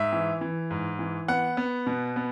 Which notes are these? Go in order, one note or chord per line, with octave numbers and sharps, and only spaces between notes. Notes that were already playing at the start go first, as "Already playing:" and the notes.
Already playing: G#2 E5
E3
E3
G#2
E3
B3 F#5
B3
B2
B3